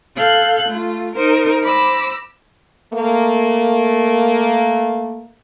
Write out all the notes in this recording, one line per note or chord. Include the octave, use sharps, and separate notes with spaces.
A4 F5 F#6 G6
A3 F4
D#4 A#4 C5
C5 B5 D6 E6 A#6
A3 A#3